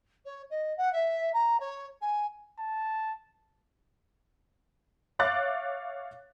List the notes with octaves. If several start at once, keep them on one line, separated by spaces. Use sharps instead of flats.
C#5
D#5
F#5
E5
A#5
C#5
G#5
A5
C#5 E5 F5 D6 F#6 A6